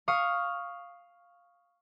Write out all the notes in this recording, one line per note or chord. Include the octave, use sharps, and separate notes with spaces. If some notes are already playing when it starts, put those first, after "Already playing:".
F5 C#6 D#6